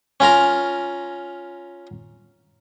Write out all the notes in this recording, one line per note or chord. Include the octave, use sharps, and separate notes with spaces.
C#4 F4 A#4 A#5